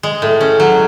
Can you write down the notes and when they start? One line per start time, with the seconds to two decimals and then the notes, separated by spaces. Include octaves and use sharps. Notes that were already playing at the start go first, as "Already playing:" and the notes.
0.03 G#3
0.22 A2
0.41 C#4
0.60 F#3